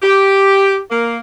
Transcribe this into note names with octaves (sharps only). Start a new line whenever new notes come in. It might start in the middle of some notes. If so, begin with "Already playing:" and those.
G4
A#3